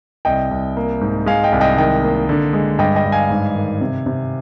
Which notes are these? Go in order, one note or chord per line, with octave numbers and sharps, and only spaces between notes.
C2 D#5 G5
C2
A#3
G#2
G#3 F5 G#5
D#5 G5
C2
D#5 G5
D#3 D#5 G5
A#3
D3
G#3
G2 D#5 G5
D#5 G5
G2
F5 G#5
G#2
D#3
C3
C3